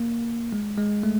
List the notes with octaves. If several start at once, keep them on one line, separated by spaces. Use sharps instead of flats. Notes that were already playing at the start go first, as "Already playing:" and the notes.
Already playing: A#3
G#3
G#3
A3